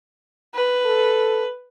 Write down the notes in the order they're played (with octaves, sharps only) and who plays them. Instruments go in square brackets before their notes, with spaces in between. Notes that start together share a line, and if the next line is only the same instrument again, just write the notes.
[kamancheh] B4
[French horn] A4